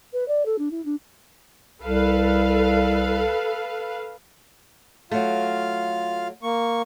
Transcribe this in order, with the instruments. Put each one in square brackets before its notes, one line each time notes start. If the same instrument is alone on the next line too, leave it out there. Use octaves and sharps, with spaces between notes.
[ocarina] B4
D5
A4
D4
E4
D4
[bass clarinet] C2 [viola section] A4 B4 F5
[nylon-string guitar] F#3 A3 [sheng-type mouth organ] F4 F5
[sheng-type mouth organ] A#3 C#6